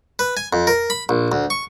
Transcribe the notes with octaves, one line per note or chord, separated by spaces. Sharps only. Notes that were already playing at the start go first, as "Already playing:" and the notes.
B4
G#5
F2
A#4
B5
A#1
D2
C#6